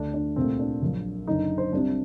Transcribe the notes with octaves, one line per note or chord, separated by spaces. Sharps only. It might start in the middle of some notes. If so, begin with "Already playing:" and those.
Already playing: D2 D3 A3 D4
D4
C2 A#2 A3 C4
D4
A#1 A#2 F#3
F#1 F#2 D3 D#4
C5
C2 C3 G3 D4